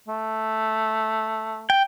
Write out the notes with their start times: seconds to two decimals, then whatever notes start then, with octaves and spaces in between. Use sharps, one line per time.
0.08 A3
1.70 G5